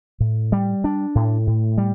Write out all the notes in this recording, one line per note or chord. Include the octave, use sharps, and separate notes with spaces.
A2
G3
D4
A2
A2
G3